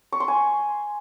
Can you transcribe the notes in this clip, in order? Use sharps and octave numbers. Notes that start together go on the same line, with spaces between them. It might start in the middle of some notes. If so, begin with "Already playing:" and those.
C#6
C6
G#5